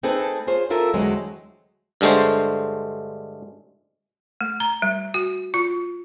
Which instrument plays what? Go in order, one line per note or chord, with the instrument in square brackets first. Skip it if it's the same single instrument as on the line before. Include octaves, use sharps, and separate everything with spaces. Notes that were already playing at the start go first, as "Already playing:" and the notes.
[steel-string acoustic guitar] A3 C4 D#4 G#4 A4 B4
F4 G#4 C5 C#5
C4 E4 F4 A4 A#4 E5
E2 D3 F#3 G#3 A3 C4
[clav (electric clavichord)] G2 D3 G#3 A3 C5
[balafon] A3
A#5
G3
F#4
F4